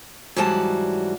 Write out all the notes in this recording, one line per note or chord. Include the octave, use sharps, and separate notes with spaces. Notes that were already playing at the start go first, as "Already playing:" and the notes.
G#2 E3 F#3 G3 F#4 A5